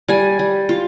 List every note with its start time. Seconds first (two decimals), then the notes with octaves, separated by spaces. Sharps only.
0.08 G3 G#5
0.39 G3
0.69 F4